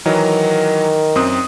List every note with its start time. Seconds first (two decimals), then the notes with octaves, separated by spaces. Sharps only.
0.06 D#3 E3 F#3 A#4
1.15 F#2 C4 D#6